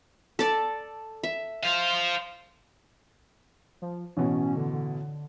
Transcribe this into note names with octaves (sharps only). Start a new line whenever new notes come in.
A4 D5
E5
C5 F5
F3
A1 B2 C#4
D3
D3